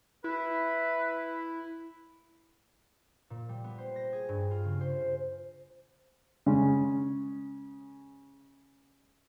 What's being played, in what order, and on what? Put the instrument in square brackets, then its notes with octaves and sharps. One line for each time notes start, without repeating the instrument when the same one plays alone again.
[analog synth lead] E4 [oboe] B4
[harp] A#2
G3
B3
C5
A#6
G#4
G2
F4
C#3
C5
[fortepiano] C#3 G#3 C#4